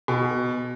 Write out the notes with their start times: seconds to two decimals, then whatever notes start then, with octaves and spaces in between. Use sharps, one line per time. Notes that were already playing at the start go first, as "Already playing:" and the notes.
0.08 B2